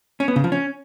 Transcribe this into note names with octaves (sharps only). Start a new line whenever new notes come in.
C#4
B3
C#3
F3
C#4